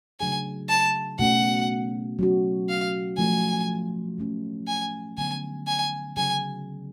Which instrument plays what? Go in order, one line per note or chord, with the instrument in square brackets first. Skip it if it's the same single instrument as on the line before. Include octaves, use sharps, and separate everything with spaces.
[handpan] C#3 F#3 A3 D4 G#4 [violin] G#5
[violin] A5
[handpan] B2 A3 C#4 [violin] F#5
[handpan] F#3 C#4 F#4
[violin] F5
[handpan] F3 A3 F4 [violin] G#5
[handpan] F3 A3 C#4
[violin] G#5
[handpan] D3 F#3 B3 [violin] G#5
[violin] G#5
[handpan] C#3 F#3 C#4 G#4 [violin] G#5